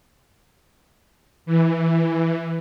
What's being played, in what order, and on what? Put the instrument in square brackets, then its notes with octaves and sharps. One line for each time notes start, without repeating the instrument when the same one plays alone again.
[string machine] E3